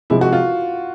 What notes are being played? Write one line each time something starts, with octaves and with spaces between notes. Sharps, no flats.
C3 F3 G#3 E4
F#4
F4